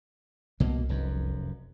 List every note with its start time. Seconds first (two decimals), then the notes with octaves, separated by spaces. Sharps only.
0.60 C2 B2 A#3
0.89 F1 F#2